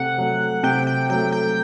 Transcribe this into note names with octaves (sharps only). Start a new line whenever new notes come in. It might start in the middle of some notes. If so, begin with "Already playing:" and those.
Already playing: C3 A3 F#5
F#3 A3
C3 G5
G5
F#3 A3 G5
G5